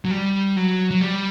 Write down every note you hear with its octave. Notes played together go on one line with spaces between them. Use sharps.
F#3
G3
F#3
F#3
G3